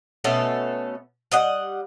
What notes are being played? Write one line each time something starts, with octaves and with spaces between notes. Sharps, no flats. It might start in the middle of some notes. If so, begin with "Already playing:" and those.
B2 A3 C#4 A4
G3 D#5 F#5